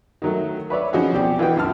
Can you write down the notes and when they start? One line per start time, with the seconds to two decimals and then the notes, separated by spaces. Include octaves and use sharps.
0.22 D#3 F#3 A3
0.70 B4 C#5 D5 E5
0.93 F3 C#4 D#4 F#4 G#4
1.13 B2 C4 G4 D5
1.39 E3 F4 F#4 D#5 G5
1.56 C#2 F#2 A5 F6